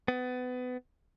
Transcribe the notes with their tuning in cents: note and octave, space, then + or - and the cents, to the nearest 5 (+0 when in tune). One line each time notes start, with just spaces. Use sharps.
B3 +25